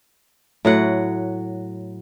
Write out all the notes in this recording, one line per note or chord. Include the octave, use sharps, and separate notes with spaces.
A2 F#3 F#5